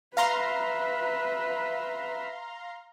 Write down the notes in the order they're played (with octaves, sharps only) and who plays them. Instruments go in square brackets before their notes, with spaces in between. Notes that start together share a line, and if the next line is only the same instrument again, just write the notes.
[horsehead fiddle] B4 E5 [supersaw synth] F5 A#5 C6